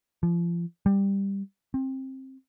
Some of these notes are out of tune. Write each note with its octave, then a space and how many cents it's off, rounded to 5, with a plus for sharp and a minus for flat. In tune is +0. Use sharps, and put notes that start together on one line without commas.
F3 -30
G3 +10
C4 +20